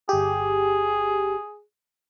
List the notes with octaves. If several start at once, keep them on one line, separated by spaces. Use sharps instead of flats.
G1 G4 G#4